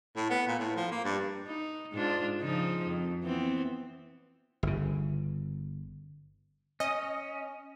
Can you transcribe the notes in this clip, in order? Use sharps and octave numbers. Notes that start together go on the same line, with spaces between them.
A2
B3
A#2
A2
F3
A#3
G2
D#4
G#2 D4 F4
C#3 F3 D#4
F2
E3 B3 C4
G1 C#3
C#4 D#5